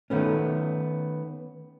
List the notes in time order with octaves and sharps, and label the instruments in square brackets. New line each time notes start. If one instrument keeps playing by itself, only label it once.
[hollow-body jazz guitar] D#3 A3 B3 C#4